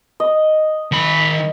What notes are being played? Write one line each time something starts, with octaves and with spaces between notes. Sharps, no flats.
D#5
D#3 B5